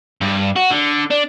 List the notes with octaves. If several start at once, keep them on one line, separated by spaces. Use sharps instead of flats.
G2
F#4
D3
D4